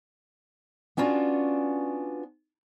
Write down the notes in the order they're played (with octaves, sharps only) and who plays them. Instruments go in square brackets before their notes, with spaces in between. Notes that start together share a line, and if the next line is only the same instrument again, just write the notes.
[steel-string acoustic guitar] B3 C#4 D4 F4 F#4